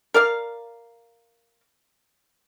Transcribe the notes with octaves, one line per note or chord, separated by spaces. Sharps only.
A#4 D5 F5